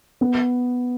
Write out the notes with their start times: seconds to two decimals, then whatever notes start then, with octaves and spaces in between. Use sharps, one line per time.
0.21 B3